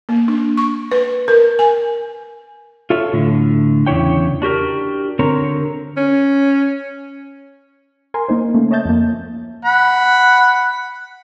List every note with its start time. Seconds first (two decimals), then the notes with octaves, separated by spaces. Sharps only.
0.09 A#3
0.28 D4
0.57 C#6
0.91 B4
1.28 A#4
1.59 G#5
2.90 F4 A4 C#5 E5
3.13 A2 D3
3.87 E2 C#3 D4 E4 C#5 G5
4.42 D4 F#4 G4 A#4
5.19 D3 C4 A#4 C#5 A#5
5.97 C#4
8.14 A#4 G#5 C6
8.29 A#3 D#4 C5
8.54 C#3 A3 A#3
8.71 C#5 D#5 E5 A5 G6 A6
8.85 F2 A#3
9.65 F#5 B5